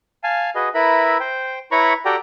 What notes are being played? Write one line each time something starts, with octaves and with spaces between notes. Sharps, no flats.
F5 G#5 A5
F#4 G#4 B4 D#5
E4 A#4 B4 E5 B5
C5 G5
E4 B4 C#5 A#5 B5 C#6
F#4 G4 A4 D5 G5 A#5